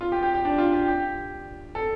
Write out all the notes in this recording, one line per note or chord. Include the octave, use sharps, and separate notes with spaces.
F4
G4
G4
G4
D4
F4
G4
G4
A4